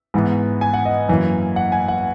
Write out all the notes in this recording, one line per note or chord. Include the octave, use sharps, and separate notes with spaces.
G#2 E3 B3
G#5
F#5
D#5
F#2 E3 A#3
F#5
G#5
F#5